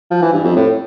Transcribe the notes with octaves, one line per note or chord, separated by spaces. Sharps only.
F3
E3
G2
F2
A2